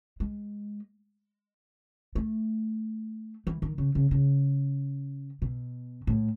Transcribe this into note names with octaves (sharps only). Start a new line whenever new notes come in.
G#3
A3
E3
D#3
C#3
C#3
C#3
B2
A2